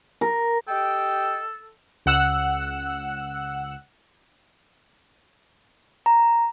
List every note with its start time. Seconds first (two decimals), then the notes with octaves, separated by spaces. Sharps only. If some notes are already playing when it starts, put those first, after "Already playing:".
0.21 A#4
0.68 G4 A4 D#5 G5
2.06 C#2 F#5 E6 F#6
6.06 A#5